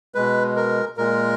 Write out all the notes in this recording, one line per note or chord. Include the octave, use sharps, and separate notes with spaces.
B2 G#3 B4
A#4
A#2 G#3 A#4